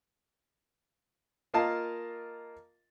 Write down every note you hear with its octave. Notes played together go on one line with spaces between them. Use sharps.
A#3 F4 A#4 D#5 F5 A5